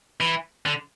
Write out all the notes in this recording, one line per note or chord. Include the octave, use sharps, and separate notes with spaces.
E3
D3